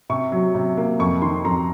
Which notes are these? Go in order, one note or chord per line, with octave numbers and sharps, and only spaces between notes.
C3 C#6
F#3
C3
A#3
F2 C#6
D#3 C6
F2 A#5